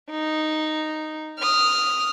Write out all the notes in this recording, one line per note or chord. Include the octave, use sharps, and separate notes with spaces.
D#4
D#6 F6